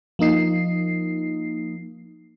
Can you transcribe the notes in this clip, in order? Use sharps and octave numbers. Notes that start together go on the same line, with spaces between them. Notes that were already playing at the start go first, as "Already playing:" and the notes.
F3 A#3 D#4 C7